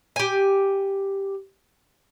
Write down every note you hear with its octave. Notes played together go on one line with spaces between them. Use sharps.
G4 G#5